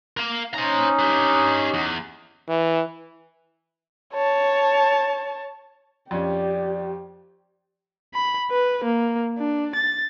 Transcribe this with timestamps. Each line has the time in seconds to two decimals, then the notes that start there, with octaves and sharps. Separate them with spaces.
0.17 A#4 F5
0.54 C#4 D#4 C5 A#5
0.99 G4 B4
1.74 E2
2.49 E3
4.13 C#5 A5
6.11 F2 C#4 G4 D5
8.14 B5
8.51 B4
8.84 A#3
9.38 D4
9.75 A6